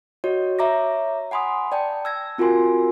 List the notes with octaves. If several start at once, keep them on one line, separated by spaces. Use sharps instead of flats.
F#4 C#5 D#5
C#5 E5 A#5 D6 A#6
F#5 G#5 B5 C6 D#6
D5 G5 A5
E6 G#6 A#6
C4 F4 F#4 A#4 G#5 C6